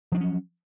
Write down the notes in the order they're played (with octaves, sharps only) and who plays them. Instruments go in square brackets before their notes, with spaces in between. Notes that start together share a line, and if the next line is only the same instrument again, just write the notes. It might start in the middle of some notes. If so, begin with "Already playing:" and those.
[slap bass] F3
D4
F#3
C#4